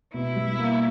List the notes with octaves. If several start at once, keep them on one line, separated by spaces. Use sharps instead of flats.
B2 E4
G3
A#3